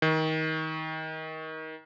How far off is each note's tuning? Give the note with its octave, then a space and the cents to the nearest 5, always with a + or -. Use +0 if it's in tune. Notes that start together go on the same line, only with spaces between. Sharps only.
D#3 +25